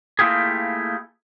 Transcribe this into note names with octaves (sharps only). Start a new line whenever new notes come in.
A3 A#3 E4 F4 G4 G#4